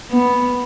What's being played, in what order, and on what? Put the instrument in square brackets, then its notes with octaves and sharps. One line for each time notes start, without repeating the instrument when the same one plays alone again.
[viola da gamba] B3